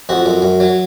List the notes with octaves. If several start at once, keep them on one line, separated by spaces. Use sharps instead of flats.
F2 F#4
F#2
F#2
F#3